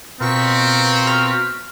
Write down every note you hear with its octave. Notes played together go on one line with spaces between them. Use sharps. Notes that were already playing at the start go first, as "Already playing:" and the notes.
B2 C4 F4 A#4 A#5 C#6 B6
F6